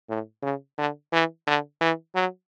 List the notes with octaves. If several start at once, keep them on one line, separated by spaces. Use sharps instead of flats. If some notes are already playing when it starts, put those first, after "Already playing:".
A2
C#3
D3
E3
D3
E3
F#3